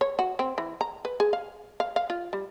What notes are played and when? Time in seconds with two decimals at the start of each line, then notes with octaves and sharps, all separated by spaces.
0.01 C#5
0.19 F#4
0.39 C4
0.58 E3
0.81 A#5
1.05 B4
1.20 G#4
1.33 F5
1.80 F5
1.96 F5
2.10 F4
2.33 G3